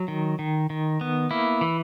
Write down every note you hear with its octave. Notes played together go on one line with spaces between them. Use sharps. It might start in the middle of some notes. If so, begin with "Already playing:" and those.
Already playing: F#3
D#3
D#3
D#3
B3
A#3 E4
E3